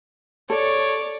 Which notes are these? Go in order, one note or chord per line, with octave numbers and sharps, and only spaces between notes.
A4 C#5 D5